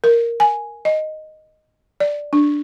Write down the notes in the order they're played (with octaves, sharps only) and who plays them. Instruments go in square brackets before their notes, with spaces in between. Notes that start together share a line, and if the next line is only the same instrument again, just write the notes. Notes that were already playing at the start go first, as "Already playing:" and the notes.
[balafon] A#4
G#5
D#5
D5
D4